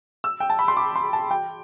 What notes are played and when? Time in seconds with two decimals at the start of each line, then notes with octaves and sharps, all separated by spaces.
0.24 E6
0.40 G5
0.50 A5
0.59 B5
0.68 C6
0.77 D6
0.96 C6
1.13 A5
1.31 G5